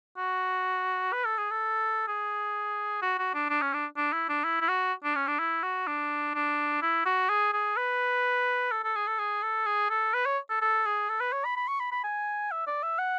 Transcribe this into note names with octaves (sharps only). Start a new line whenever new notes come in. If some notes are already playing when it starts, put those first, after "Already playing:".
F#4
B4
A4
G#4
A4
G#4
F#4
F#4
D4
D4
C#4
D4
D4
E4
D4
E4
E4
F#4
D4
C#4
D4
E4
F#4
D4
D4
E4
F#4
G#4
G#4
B4
A4
A4
G#4
A4
G#4
A4
G#4
A4
B4
C#5
A4
A4
G#4
A4
B4
C#5
B5
B5
C#6
B5
B5
G#5
E5
D5
E5
F#5